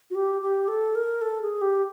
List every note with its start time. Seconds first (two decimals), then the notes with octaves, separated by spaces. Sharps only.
0.10 F#4
0.15 G4
0.42 G4
0.68 A4
0.95 A#4
1.21 A4
1.42 G#4
1.61 G4